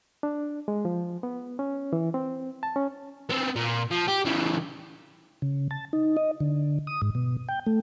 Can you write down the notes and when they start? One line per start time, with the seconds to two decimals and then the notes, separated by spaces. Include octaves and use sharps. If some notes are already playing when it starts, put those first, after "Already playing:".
0.23 D4
0.68 G#3
0.85 F3
1.23 B3
1.59 C#4
1.93 E3
2.14 C4
2.63 A5
2.76 C#4
3.30 B3 C4
3.56 A#2
3.91 F3
4.08 G4
4.25 C#3 E3
5.42 C#3
5.71 A5
5.93 D#4
6.17 D#5
6.40 D3
6.87 D#6
7.02 G#2
7.15 B2
7.49 G5
7.66 A3